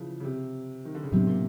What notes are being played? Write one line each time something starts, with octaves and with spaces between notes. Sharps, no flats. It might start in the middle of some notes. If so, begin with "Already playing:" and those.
Already playing: C#3 E3 F3
C#3
C3
D#3
D3
C#3
A2 C3 F#3 B3 D4
A#2